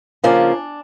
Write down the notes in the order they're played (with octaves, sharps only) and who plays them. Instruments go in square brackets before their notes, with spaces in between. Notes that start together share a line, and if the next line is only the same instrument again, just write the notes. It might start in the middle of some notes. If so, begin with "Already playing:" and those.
[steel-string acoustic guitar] C#3 F3 A#3 C#4 D4